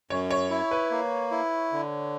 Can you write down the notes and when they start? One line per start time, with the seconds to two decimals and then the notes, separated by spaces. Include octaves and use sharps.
0.10 F#2 C#5
0.30 C#5
0.51 E4
0.71 B4
0.91 A#3
1.31 E4
1.73 D3